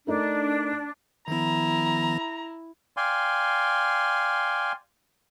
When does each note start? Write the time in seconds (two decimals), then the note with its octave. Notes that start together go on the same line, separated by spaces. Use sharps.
0.07 A3 D4 D#4 A#4
1.28 D#3 F3 B3 E4 A#5
2.97 D5 F5 G5 G#5 C6